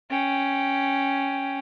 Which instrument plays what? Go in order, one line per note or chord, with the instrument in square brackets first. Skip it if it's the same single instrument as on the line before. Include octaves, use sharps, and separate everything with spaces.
[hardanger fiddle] C#4 G5